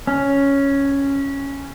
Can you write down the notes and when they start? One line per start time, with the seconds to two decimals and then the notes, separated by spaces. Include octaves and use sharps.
0.07 C#4